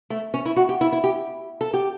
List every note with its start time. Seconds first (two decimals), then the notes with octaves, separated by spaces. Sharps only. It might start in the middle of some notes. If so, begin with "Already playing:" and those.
0.10 A3
0.34 C#4
0.45 E4
0.56 F#4
0.69 G4
0.81 E4
0.92 E4
1.04 G4
1.61 A4
1.74 G4